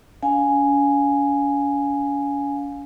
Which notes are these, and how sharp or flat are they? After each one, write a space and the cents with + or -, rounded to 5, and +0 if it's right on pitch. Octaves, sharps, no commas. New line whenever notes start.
C#4 +40 F5 +20 G#5 +0